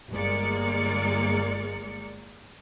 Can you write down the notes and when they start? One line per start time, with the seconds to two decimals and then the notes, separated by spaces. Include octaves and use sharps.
0.11 G1 G#3 A#3 A#4 D5 C#7